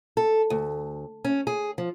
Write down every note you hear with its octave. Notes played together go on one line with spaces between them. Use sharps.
A4
D2
C#4
G#4
F3